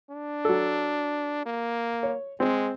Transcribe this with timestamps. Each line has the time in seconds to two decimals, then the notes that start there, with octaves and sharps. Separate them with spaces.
0.10 D4
0.45 F#3 A4
1.46 A#3
2.03 C#5
2.40 G#3 C4